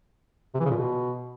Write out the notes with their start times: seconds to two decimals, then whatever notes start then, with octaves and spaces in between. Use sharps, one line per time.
0.55 C3
0.60 E3
0.65 C#3
0.71 A#2
0.76 B2